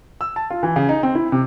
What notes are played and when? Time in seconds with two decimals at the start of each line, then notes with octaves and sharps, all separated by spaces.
0.21 E6
0.36 A5
0.50 F4
0.63 E3
0.76 C#3
0.89 D#4
1.03 C4
1.15 E4
1.32 C3